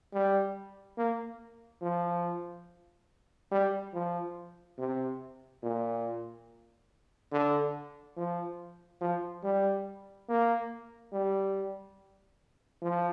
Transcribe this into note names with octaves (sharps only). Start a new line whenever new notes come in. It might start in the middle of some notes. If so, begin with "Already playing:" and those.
G3
A#3
F3
G3
F3
C3
A#2
D3
F3
F3
G3
A#3
G3
F3